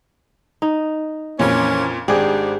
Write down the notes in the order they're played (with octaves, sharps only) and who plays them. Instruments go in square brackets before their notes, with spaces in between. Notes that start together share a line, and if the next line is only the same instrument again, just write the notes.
[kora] D#4
[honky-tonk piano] F2 A#2 [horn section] E3 A#3 C#4
[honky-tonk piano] G#1 D6 [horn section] G#2 D4 [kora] G4 G#4